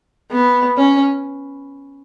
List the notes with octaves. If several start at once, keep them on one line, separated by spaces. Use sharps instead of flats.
B3
C#4